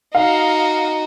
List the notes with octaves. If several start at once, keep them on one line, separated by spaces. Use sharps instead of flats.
D#4 F#4 F5